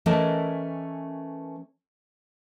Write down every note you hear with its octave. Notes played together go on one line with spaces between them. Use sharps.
E3 A3 C#4 A#4 D#5 A5